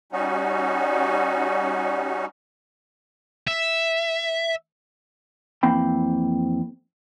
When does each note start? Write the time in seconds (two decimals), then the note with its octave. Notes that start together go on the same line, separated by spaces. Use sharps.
0.12 G3 C#4 D#4 F#4
3.47 E5
5.63 F2 E3 A#3 C4 G5 B5